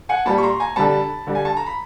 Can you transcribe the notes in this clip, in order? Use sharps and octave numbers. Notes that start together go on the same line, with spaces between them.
F#5 G#5
A#2 G3 A5 B5
C#6
A#5 C6
G#5 A#5
D3 G3 A5 B5
D3 G3
G#5
A5
A#5
B5